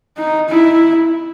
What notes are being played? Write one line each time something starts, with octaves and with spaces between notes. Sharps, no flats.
D#4
E4